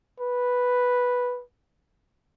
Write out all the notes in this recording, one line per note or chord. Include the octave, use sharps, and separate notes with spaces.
B4